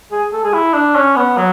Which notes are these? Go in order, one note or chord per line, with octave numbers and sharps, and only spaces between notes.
G#4
A4
G#4
E4
D4
C#4
B3
F#3